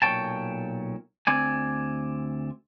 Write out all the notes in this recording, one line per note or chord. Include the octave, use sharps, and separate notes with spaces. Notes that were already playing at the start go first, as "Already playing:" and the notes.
B1 A#2 D4 C#5 G5 A5
D2 C4 D5 G#5